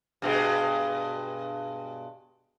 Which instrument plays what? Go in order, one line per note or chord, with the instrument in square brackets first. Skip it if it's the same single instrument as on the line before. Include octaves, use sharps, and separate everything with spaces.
[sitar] G2 B2 G#3